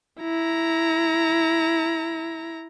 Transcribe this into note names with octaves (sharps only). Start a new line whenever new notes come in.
E4 A#5